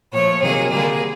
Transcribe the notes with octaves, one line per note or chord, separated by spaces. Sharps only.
A#2 F3 A3 C#5
C3 D#3 F#3 A#3 G#4
D3 G3 A#3 G#4